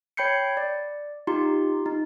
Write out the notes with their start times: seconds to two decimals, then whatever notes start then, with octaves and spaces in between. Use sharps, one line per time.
0.17 C#5 G5 B5 G6 C7 C#7
0.57 D5
1.27 D#4 F4 G4 C6
1.86 D#4